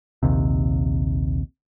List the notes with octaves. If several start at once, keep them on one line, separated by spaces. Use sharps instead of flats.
A#1 D#2 C3